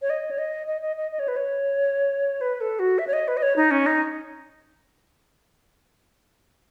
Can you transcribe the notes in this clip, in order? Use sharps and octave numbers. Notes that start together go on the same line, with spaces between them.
C#5
D#5
C#5
D#5
D#5
D#5
D#5
D#5
C#5
B4
C#5
B4
A4
F#4
E5
C#5
D#5
B4
D#5
C#5
D#4
C#4
D#4